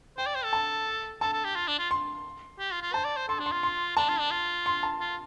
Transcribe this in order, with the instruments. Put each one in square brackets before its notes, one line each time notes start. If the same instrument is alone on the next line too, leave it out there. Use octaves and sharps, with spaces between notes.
[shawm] C5 [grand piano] G5
[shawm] D5
C5
A4
[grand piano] A5
[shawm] A4 [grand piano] A5
[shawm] A4
G4
F4
D4
F4
[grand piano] C6
[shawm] G4
F4
F4
[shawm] C5 [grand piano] A5
[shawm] D5
C5
[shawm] A4 [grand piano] C6
[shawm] D4
[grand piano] C6
[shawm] F4
[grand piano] C6
[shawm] D4 [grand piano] A5
[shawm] F4
D4
F4
[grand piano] C6
A5
[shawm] F4